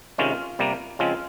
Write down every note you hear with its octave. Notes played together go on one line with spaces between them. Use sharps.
C3 D#3 G#3 C#4 F4
C3 G3 A#3
C#3 F3 G#3 C4 F4